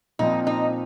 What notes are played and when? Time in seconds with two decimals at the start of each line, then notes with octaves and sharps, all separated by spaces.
0.19 A#2 F3 C4 D#4
0.47 D#4